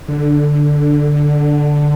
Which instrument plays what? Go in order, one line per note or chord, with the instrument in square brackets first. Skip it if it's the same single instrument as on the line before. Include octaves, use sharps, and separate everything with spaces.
[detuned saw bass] D3